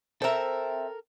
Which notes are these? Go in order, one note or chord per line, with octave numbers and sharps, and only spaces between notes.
C4 A4 A#4 E5